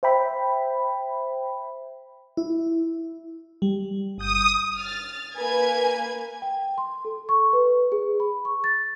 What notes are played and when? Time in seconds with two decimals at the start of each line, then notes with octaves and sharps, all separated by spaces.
0.03 C5 E5 G5 B5
2.37 E4
3.62 G3
4.18 G1 D#6 G6
4.77 F6 A6
5.36 A#3 B4 G#5 G#6
6.42 G5
6.78 C6
7.05 A4
7.29 C#6
7.53 B4
7.92 G#4
8.20 B5
8.45 C#6
8.64 A6